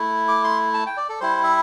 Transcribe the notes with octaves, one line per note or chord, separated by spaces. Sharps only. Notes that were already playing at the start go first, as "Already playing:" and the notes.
Already playing: A3 E4
D6
C6
A5
G5
D5
A4
G3 E4 C5
E5